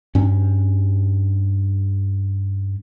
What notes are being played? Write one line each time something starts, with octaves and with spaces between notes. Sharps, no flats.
G2 C#4